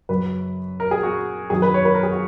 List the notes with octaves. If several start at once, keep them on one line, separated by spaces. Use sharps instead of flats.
F#2 C#3 F#3 B4
A#4
G#4
F#4
F#2 D#3 F#3 G#4
B4
C#5
B4
A#4
G#4
F#4